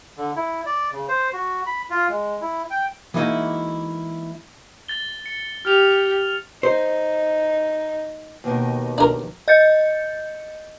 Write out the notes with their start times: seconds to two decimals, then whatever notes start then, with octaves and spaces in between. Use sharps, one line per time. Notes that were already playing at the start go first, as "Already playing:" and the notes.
0.18 D3
0.36 E4
0.66 D5
0.93 C#3
1.08 C5
1.33 F#4
1.66 B5
1.90 F4
2.09 G#3
2.41 E4
2.70 G5
3.14 E3 G#3 A#3 D#4 E4 F#4
4.88 A6 G7
5.26 C#7
5.65 G4 F6 F7
6.63 D#4 C5
8.44 D#2 B2 D#3
8.98 D4 A#4
9.48 D#5 G6 A6 C#7